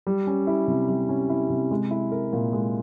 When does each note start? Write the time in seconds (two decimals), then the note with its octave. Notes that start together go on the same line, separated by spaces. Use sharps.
0.07 G3
0.27 C#4
0.47 E4
0.68 C3
0.89 G3
1.09 C#4
1.30 E4
1.50 C3
1.71 G#3
1.91 E4
2.12 A#4
2.33 A#2
2.53 G#3